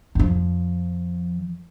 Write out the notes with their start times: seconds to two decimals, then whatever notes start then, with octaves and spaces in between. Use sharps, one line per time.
0.15 F2 F3